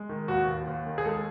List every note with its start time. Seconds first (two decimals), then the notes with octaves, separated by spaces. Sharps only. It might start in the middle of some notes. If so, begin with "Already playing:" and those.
Already playing: G#3
0.09 D#3
0.28 D#2 F#4
0.48 D#2
0.67 D#2
0.87 D#3
0.98 G#4
1.05 G#3 A4